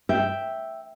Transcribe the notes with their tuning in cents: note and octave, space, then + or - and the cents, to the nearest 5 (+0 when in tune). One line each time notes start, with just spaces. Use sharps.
E5 +0 G5 +0